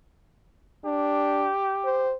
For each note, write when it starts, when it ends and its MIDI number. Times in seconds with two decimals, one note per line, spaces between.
0.85 1.49 62
0.85 2.15 67
1.85 2.14 72